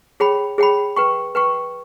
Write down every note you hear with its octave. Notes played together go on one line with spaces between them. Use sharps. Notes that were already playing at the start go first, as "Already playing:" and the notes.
G#4 C#5 G5 B5
G#4 C#5 G5 B5
B4 G5 C#6
B4 G5 C#6